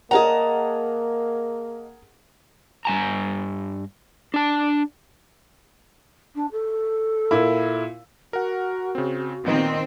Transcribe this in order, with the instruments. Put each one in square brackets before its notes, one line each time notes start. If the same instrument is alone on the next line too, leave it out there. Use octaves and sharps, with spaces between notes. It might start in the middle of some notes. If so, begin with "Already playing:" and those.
[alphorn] A#3 [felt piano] G#4 A#4 F#5 [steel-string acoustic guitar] D#5 A5 A#5
[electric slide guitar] G2 G#5 A#5
D4 A5
[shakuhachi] D4
A4
[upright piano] A#2 E4
[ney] F#4 [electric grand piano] A#4 F#5
[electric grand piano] C#3 C4
[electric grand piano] A#2 B3 D#5 [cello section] D#3 C4